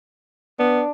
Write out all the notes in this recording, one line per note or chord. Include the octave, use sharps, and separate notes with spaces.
B3 D4